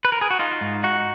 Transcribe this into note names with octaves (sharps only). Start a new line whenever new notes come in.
B4
A#4
G#4
F#4
D#4 F4
G#2
D#4 F#4